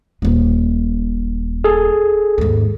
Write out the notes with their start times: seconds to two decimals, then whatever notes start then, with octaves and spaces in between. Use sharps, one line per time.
0.22 D#1 G#3
1.64 G#4 A4
2.38 D#2 G#2